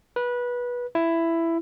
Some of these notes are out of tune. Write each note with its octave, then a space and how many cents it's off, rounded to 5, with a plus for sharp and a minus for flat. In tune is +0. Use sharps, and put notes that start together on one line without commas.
B4 -20
E4 +10